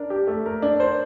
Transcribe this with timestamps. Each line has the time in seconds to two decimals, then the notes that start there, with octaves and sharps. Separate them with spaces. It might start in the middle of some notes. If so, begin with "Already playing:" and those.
Already playing: D4 A#4
0.10 G4
0.27 A3
0.46 A#4
0.62 D4
0.80 C5